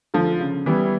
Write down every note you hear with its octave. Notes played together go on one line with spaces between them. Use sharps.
D3 F3
C#3
E3 G3 B3 E4